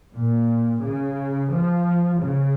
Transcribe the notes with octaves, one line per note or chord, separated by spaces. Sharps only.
A#2
C#3
F3
C#3